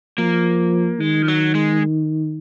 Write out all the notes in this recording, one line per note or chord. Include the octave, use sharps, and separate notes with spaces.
F3 A#3
D#3 G#3
F3
F#3
G#3